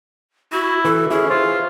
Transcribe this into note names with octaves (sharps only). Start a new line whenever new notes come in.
E4 F#4
E3 A4
C#4 E4 G#4
F4 C5